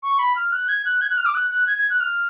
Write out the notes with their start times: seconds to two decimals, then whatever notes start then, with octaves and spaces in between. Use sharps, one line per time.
0.03 C#6
0.19 B5
0.36 F6
0.52 F#6
0.69 G#6
0.85 F#6
1.02 G#6
1.10 F#6
1.18 F6
1.26 D6
1.34 F#6
1.51 F#6
1.67 G#6
1.79 G#6
1.90 F#6
2.00 F6